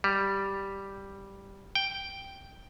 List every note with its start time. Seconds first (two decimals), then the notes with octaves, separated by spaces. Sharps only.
0.04 G3
1.75 G5